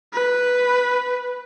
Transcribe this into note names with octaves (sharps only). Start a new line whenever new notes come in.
B4